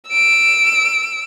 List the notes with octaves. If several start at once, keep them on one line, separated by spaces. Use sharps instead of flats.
E6 D7